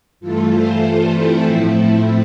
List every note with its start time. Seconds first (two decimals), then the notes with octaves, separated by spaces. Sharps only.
0.20 G2 E3 A3 F4 A4
0.51 A4 C5
0.81 A4 C5
1.12 C4 E4
1.44 A2 F3 A3